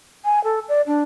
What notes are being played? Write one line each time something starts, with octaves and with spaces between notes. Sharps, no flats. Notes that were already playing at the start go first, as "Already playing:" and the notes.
G#5
A4
D5
D4